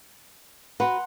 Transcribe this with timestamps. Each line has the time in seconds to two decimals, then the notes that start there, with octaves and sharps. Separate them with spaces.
0.80 F#4 B4 F#5 A#5 C6